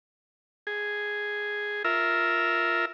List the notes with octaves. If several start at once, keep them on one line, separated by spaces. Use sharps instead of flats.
G#4
F4 A#4 E5